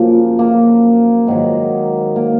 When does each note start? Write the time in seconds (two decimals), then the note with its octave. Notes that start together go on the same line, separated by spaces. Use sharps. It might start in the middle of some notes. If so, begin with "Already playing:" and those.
Already playing: F#2 C#3 F3 A#3
0.39 A#3
1.27 G#2 D#3 F#3
2.16 A#3